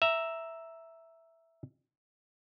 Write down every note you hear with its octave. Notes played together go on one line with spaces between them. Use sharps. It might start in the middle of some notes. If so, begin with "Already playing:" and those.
E5 A#5